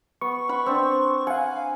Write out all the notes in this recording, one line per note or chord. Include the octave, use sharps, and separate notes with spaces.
B3 C#6
F#5 B5
C4 D4
F5 F#5 G#5